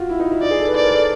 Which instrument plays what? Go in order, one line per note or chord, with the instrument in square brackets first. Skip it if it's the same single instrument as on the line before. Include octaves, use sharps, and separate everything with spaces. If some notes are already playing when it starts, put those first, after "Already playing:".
Already playing: [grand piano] F4 F#4
E4
D#4
E4
[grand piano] D#4 [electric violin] D5
[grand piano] G#4
A4
B4
[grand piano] C5 [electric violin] D5
[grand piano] A#4
A4